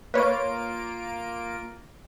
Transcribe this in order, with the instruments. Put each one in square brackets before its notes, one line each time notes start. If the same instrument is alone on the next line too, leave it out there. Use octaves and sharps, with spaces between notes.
[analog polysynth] A#3 F4 D7 [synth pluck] B4 C#5